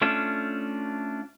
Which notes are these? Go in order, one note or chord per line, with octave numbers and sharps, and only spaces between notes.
A3 C#4 D4 F4